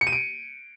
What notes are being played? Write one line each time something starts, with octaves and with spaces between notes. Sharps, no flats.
C#7
D#7
D7